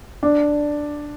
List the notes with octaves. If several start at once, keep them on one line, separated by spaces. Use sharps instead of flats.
D4